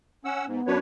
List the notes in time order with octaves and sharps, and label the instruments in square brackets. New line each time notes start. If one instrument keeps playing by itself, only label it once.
[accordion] C#4 F#5 E6
[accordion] G#2 [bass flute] B3
[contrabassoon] F#2 [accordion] D4 B4 C#5